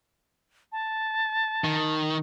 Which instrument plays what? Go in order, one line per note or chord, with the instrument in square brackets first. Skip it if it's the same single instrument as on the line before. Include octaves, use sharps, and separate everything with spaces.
[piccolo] A5
[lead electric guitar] D#3